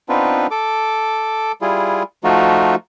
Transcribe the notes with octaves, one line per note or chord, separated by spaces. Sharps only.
B3 C4 D4 D#4 F4 B4
A4 D6
G3 E4 F4 G#4
F3 A3 D#4 F4 F#4